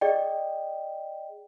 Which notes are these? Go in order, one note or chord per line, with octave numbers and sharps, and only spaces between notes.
G#4 D5 D#5 G5